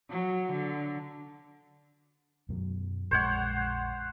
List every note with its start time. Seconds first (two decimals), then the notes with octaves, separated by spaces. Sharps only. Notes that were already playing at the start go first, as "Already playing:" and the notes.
0.10 F#3
0.52 D3
2.49 F#2 B2 F#3
3.11 A#1 F2 G#3 C5 C#5 F#5